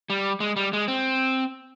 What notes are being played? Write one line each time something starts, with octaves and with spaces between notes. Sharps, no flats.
G3
G#3
G3
G#3
C4